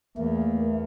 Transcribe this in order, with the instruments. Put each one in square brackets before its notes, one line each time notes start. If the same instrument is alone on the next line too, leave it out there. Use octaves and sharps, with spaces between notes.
[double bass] E2 [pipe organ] A3 [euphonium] A#3